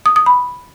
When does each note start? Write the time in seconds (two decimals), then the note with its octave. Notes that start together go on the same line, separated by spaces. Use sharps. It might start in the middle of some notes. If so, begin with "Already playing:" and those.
0.06 D#6
0.16 D#6
0.26 B5